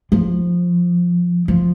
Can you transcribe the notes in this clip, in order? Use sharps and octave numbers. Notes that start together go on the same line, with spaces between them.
F3
F3